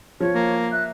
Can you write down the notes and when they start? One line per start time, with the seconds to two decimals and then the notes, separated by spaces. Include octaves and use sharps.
0.20 F3 C#5
0.35 A#3
0.72 E5 F#6